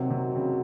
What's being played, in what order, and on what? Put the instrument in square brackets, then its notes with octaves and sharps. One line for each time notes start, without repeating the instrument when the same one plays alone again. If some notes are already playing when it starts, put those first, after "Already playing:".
Already playing: [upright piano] C3 [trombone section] D#3 F#3 C4 F#4
[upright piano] C3
C#3